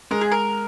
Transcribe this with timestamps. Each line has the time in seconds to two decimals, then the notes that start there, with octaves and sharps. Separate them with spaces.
0.11 G#3 A#4
0.21 G#4
0.32 A#4